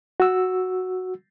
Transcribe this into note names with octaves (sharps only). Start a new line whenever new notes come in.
F#4 E6